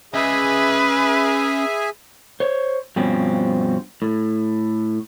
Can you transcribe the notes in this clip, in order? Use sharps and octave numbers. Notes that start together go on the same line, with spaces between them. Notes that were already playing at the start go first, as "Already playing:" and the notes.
C#4 G#4 B4 D#5 E5 G#5
C5 C#5
G2 B2 F3 C4 C#4
A2